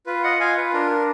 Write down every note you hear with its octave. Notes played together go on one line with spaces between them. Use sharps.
F4 B4
D#5 F#5
F4 F5 G#5
B4
D4 A#4